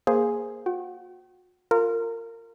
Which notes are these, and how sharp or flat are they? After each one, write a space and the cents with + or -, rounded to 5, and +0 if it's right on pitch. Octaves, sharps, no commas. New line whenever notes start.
A#3 +0 G#4 +0 C5 +0
F#4 -40 G5 -45
F4 +0 A#4 -25